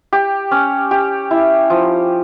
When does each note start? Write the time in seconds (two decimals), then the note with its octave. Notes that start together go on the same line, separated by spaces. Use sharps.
0.13 G4
0.51 C#4
0.91 G4
1.31 E4
1.70 F3